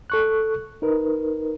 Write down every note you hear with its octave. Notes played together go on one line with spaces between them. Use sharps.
A4 C#6 F#6
D#4 A#4 B4